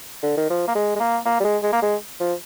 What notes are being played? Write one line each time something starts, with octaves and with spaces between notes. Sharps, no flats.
D3
D#3
F3
A#3
G#3
G#3
A#3
A#3
G3
G#3
G#3
A#3
G#3
F3